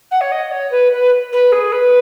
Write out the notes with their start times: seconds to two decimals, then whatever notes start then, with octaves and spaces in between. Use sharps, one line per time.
0.10 F#5
0.20 C#5
0.31 D#5
0.51 C#5
0.71 B4
0.91 B4
1.32 B4
1.51 G#4
1.71 B4